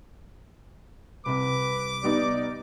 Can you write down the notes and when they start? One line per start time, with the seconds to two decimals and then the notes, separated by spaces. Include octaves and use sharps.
1.26 C2 C3 B4 D6
2.03 G3 B3 D#4 D5